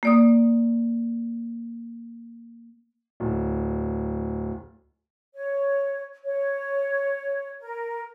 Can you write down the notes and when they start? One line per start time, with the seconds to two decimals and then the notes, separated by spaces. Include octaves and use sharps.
0.03 A#3 D5 D#6
3.20 D1
5.35 C#5
6.25 C#5
7.60 A#4